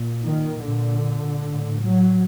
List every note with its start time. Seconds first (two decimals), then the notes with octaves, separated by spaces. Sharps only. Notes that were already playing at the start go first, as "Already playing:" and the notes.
Already playing: A#2
0.22 D#3
0.61 A#2 D3
1.41 A2
1.80 F#3